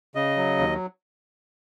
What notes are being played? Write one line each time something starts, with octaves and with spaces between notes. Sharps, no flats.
C#3 D#5
F#3
D#2